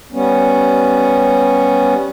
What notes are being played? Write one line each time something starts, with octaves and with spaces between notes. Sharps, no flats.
G3 B3 C#4